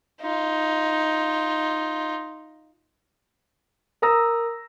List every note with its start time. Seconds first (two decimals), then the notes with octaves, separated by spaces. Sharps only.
0.21 D#4 F4
4.02 A#4 A#5 D#6 E6 A#6